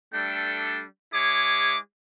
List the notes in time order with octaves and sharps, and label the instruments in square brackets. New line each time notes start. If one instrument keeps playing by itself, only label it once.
[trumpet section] G3 A3 D4 A4 G5
G#3 E4 G#4 C#5 D6